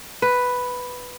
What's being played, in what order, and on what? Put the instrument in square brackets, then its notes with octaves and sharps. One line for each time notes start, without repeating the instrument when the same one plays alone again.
[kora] B4